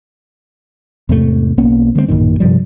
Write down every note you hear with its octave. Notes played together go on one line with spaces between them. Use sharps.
E2 G#2 C3 A3
B1 A#3 B3 C#4
D3 G#3 A3 C4
A1 F#2 A#2 D#3
G2 C3 F3 G3